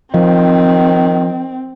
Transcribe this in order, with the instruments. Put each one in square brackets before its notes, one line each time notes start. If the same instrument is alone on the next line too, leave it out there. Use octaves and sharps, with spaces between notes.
[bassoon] D#3 [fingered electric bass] F3 [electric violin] C4